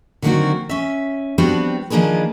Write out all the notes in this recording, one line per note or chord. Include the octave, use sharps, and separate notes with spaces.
D3 D#3 F#3 A#3 C4 F#4
C#4 E5
F3 G3 B3 C4 D4 F#4
D#3 F3 A#3 D4 G#4 B4